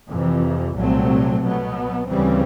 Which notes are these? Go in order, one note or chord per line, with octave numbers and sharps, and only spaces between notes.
F2 C3 E3
C2 A#2 F#3 A3 C4
B2 F#3 B3
D2 C#3 E3 G3 C4